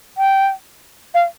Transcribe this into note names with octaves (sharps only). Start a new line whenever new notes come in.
G5
F5